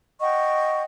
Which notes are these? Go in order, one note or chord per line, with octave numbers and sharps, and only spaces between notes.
D#5 F#5 G5 C#6